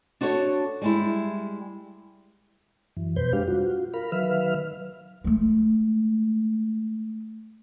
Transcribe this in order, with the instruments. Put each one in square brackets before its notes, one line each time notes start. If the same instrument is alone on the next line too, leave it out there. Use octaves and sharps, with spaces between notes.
[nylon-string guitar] D4 F#4 A4 C5 C#5
G3 G#3 E4
[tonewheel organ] F#2 E3
F2 B2 B4 C5 G6
G3 G#3 D4 G4 F5
F4 F#4
A#4 F5 B5
D#3 F#3 B4 E5 F5 F6
[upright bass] G#3 A3